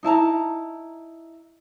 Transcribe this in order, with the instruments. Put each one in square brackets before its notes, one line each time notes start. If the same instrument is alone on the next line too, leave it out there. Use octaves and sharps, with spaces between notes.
[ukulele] D#4 E4 A5 A#5